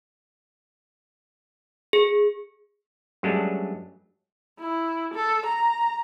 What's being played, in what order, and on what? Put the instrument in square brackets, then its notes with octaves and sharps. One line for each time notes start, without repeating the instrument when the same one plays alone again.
[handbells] G#4
[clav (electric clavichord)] G2 F#3 G#3 A3 C#4 D4
[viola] E4
A4
A#5